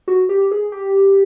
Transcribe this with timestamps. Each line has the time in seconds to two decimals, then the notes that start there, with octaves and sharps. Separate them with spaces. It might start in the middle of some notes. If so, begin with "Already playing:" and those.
0.08 F#4
0.29 G4
0.51 G#4
0.72 G4